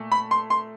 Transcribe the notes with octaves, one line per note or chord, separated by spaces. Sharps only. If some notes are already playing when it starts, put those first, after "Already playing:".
Already playing: A#2 A3
B5
C6
C6